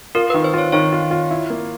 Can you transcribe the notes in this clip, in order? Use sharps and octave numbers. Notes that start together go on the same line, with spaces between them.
F4 A#4
B4
D#3
C5
F4 C#5
D#3 C#5
F4
F4
E4
A#3